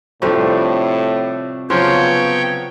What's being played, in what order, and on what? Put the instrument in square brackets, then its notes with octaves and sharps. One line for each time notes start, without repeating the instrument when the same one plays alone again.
[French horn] A2 [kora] C3 F3 G3 [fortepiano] A3 D4
[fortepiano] C#3 F3 F#3 [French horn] B3 [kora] F4 [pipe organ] C#5 G5